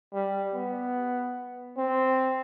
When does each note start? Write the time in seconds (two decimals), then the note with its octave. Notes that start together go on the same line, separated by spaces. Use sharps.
0.14 G3
0.54 B3
1.78 C4